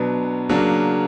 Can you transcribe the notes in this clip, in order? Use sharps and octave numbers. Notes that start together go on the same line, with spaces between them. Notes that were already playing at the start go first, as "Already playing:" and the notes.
Already playing: B2 F#3 B3 D4
C#3 F#3 A#3 D4